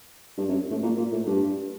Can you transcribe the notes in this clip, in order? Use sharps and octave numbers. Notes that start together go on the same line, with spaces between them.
G2
F#2
A2
A#2
A#2
A2
G2